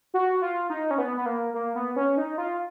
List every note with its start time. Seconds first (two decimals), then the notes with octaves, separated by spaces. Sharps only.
0.14 F#4
0.42 F4
0.70 D#4
0.91 C#4
0.98 B3
1.17 B3
1.26 A#3
1.54 A#3
1.75 B3
1.96 C#4
2.17 D#4
2.38 F4